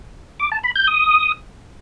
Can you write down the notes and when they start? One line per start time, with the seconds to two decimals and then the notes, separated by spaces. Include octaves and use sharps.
0.40 D6
0.52 A5
0.64 B5
0.76 G6
0.88 D#6